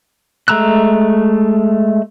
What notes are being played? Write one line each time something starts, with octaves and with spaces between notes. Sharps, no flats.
G#3 A3 A#5 E6 F#6